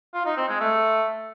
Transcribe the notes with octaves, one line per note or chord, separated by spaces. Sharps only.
F4
D#4
C4
G#3
A3